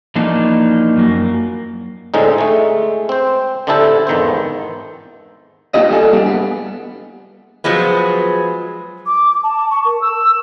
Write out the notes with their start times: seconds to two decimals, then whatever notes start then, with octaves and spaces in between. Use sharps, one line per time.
0.15 E3 F3 A#3 D4 D#4
0.96 F#2 A#3
2.14 A2 D3 G#3 C4 D#4
2.38 G#3 A3
3.09 C4 C5
3.67 D3 C4 D4 E4 G4 A4
4.07 G#1 E2 D#3 B3 A4 C5
5.74 A#3 D4 F4 G4 D#5
5.91 G2 G3 A4 G#5
6.13 G3 A#3 B3 D4 G4 G#4
6.26 B3
7.64 F3 F#3 G#3 B3
9.06 D6
9.43 A5
9.70 C#6
9.84 A#4
10.01 E6